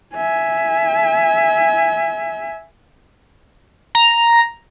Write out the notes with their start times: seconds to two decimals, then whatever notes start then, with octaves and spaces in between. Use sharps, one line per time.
0.15 E5 G#5
3.95 A#5